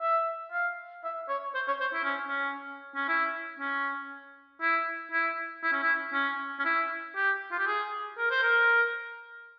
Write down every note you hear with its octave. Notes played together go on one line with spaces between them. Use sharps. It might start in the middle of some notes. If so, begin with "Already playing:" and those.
E5
F5
E5
C#5
C5
C#5
C5
E4
C#4
C#4
C#4
E4
C#4
E4
E4
E4
C#4
E4
C#4
C#4
E4
G4
F4
G4
G#4
A#4
C5
A#4